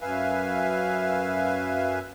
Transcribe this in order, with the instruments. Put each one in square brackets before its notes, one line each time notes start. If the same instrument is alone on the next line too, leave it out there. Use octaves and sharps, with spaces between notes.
[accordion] F#2 B4 E5 F5 G#5